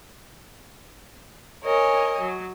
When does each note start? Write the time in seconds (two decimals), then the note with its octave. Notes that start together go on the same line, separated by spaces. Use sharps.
1.64 A#4 C#5 D#5 G#5
2.20 F#3